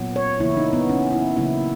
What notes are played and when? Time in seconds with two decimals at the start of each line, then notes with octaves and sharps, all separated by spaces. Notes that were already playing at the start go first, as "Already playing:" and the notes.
Already playing: A#2 F#3 B3
0.16 C#5
0.40 C#3 E3 A#3 E4
0.57 D#4
0.73 B3
0.89 C#4
1.13 E4
1.37 C#3 F#3 A#3 E4